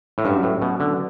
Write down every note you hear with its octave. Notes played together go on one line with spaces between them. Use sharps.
A2
G2 F#3 C#4 F#4 B4 F#5
A2
B2
D3